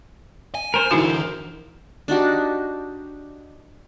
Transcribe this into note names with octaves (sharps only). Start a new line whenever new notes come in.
G#5
A#4 C5
D3 E3 D#4 E4 F#4
D4 D#4 F#4 G4